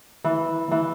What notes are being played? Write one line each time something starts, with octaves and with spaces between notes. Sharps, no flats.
E3
E3